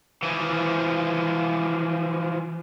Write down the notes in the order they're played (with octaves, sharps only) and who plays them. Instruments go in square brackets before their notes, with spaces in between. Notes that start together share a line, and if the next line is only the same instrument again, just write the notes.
[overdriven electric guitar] E3 F3